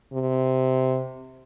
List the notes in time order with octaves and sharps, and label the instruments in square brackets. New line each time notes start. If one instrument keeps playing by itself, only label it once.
[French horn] C3